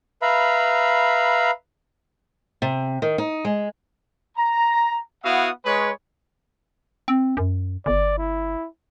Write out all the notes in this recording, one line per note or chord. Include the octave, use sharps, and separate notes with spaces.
B4 E5 F5 A#5 B5
C3
D#3
D#4
G#3
A#5
B3 E4 F#4 F5 F#5 D#6
G#3 B4 C#5
C4
F#2
G1 D5
E4